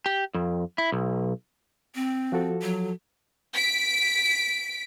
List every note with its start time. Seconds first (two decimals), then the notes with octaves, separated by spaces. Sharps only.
0.06 G4
0.34 F2
0.78 E4
0.92 B1
1.95 C4
2.32 F3 F#4 A4
2.62 F#3
3.54 B6 D7